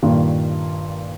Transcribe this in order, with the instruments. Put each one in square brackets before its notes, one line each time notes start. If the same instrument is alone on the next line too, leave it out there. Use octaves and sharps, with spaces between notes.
[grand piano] G2 A#2 D#3